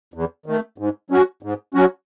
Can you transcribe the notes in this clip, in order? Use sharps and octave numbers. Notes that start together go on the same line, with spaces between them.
E2
D#3 A3
G#2
F#3 C#4 F#4
G#2
F#3 C#4 F#4